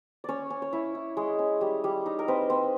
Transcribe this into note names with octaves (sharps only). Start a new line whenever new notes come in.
C#4 C#5 D5
C#4
C#5
E4
E4
G#3
C#4
G3
G3
D#4
A#4
C4 B4
C4